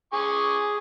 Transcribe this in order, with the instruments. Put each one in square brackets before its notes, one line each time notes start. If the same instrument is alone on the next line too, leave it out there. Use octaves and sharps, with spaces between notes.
[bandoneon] G#4 [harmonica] G#5 C#6 D6